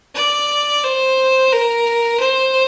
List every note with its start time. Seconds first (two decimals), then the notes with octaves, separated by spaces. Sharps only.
0.15 D5
0.84 C5
1.52 A#4
2.20 C5